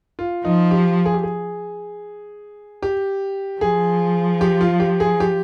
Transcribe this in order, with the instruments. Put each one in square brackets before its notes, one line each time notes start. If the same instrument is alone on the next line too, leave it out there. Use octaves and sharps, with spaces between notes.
[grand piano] F4
[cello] F3 [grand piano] D#4
[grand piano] G4
G#4
G4
G#4
G4
[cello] F3 [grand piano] G#4
[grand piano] G4
F4
G4
G#4
G4